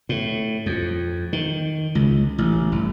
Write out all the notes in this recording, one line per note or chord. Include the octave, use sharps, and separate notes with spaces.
A2
F2
D#3
C#2
A1
G1